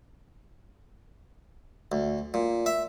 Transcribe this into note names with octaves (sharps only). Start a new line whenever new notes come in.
D2
A#2
E5